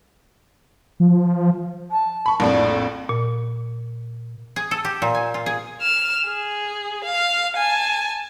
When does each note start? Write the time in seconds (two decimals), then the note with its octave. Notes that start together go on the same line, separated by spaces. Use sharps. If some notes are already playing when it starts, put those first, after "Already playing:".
1.00 F3
1.91 A5
2.26 B5 C#6
2.40 A#1 F2 A2 D5
3.09 A#2
4.56 G#4
4.71 A4
4.85 G4
5.02 A#2
5.15 G#5
5.34 F4
5.46 G#4
5.82 F6 E7
6.27 G#4
7.04 F5
7.57 G#5 A5